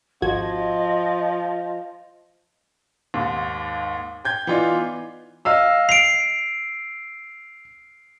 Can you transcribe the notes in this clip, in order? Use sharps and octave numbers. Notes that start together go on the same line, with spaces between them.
G#1 F3 F#4 D#5 G#6
D#2 G#2
G5 G6 G#6
E3 B3 D#4 F4 D5
D#5 F5 E6
C7 D7 F7